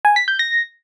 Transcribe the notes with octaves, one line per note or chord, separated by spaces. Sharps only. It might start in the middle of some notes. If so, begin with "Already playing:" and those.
G#5
B6
G6
A#6